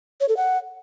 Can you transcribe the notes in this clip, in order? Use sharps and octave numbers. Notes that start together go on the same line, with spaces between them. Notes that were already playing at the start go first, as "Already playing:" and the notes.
C#5
A4
F#5